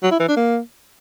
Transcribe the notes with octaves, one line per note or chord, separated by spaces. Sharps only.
F#3
E4
E3
D4
A#3